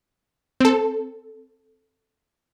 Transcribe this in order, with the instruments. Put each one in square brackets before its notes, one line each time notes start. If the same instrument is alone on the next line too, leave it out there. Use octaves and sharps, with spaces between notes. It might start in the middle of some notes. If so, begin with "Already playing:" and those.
[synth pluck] C4 A4